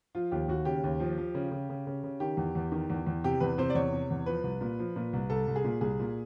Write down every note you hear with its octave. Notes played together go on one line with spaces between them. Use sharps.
F3 F4
D#2 G4
D#2 F#4
C#3 G4
D#2
F3
F3
C#3
C#3
C#3
C#3
C#3
D#3 G4
E2
E2
D#3
E2
E2
C3 G4
E2 B4
C3 C5
D5
E2 C#5
C3
E2
F3 B4
C2
A#2
F3
A#2
C2
C2 A4
C2
G#4
A#2
C2 G#4
A#2